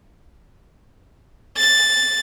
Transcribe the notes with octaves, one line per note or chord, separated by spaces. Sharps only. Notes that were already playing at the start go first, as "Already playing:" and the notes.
A6